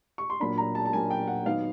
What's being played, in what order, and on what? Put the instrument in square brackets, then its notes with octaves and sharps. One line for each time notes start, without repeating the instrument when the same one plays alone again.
[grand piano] C#6
C6
A#2 F#3 A#3 D4 B5
A#5
A5
A5
A#2 F#3 A#3 D4 G#5
G5
F#5
D#3 F#3 B3 D#4 F5